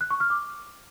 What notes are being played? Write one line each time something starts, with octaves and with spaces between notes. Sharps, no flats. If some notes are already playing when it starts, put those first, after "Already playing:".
F#6
C#6
F6
D6